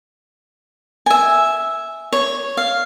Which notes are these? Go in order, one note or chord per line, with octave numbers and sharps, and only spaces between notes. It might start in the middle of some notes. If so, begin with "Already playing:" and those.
E5 G#5
C#5
F5